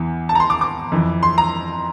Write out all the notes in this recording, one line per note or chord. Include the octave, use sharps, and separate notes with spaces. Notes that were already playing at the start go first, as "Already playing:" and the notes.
Already playing: E2 E3
A5
A#5
C6
D6
D6
F2 E3
C6
A#5